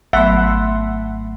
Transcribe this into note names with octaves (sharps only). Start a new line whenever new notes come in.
G#1 F#3 A3 B3 E5 F#5 C6